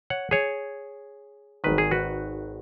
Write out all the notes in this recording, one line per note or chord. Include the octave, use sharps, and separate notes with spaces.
C#5 F#5
G#4 C#5
G#1 G#2 D#3 B4
G#4
F#4 B4